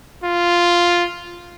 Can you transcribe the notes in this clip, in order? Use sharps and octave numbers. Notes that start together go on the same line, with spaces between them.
F4